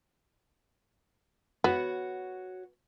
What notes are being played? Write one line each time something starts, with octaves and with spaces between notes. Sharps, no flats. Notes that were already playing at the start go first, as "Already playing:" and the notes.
B3 F#4 C#5 F#5